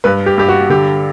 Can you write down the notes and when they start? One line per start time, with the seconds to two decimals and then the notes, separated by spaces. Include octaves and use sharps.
0.04 G2 B4
0.26 G4
0.38 G2 G4
0.48 F#4
0.70 D3 G4